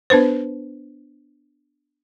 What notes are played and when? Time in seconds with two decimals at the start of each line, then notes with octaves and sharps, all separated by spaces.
0.10 B3 D4 B4 C5